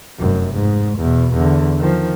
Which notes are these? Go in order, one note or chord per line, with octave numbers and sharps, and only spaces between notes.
F1 F#2
G#2
E2 B2
E2 D3
D#3 F3